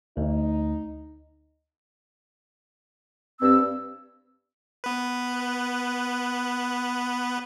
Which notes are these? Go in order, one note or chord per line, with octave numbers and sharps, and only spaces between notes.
D2 D#4
G2 C4 E6
B3 B4